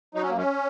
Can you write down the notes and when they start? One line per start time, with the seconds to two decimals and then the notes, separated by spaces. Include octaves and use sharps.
0.15 F#3 D#4
0.23 C#4
0.30 F#2 A#3
0.38 C#4